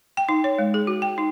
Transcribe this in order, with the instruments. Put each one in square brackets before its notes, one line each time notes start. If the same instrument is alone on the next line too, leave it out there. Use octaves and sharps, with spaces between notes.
[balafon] G5
D#4
C#5
G#3
G#4
F#4
G5
D#4